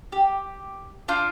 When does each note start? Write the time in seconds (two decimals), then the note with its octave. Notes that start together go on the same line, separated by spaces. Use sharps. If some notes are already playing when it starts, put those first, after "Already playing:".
0.12 G4
1.08 D4 F4 G6